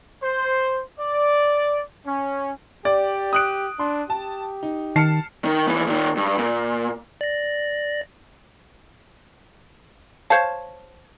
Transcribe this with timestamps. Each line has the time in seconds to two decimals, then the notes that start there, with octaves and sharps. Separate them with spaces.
0.23 C5
0.99 D5
2.06 C#4
2.85 G4 D5
3.33 D#6 F#6 D7
3.79 D4 C6
4.10 G4 A5
4.63 D#4
4.96 D#3 A5 F6 C7 C#7
5.45 D#3
5.67 D#2 E3
5.87 A#2 D#3
6.17 G2
6.39 A#2
7.21 D5 A#6
10.30 C5 C#5 F5 A5